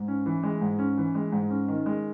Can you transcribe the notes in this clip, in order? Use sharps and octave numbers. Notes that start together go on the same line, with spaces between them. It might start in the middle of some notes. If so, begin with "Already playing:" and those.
Already playing: G#2
C#4
E3
G#3
G#2
C#4
E3
G#3
G#2
C#4
D#3
G#3